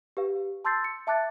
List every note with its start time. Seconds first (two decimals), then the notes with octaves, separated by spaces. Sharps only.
0.17 G4 B4 F5
0.65 A5 C6 E6 G6 A6 C7
0.84 C#7
1.07 E5 A5 D6 F#6 A6